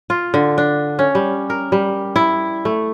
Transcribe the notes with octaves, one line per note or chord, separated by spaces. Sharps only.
F4
D3
D4
C#4
G3
A#4
G3
E4
A3